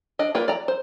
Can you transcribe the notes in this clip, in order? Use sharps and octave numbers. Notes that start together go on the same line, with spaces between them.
D4 D#5
A#3 F4 B4 D5
D5 A#5
C5